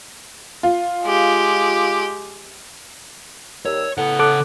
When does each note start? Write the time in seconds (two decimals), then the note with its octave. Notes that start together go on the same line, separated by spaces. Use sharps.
0.63 F4
1.04 G#3 G4
3.65 D#2 G3 C#5 E6
3.98 A2 C#3 B3 F#5
4.19 A4 D6 F#6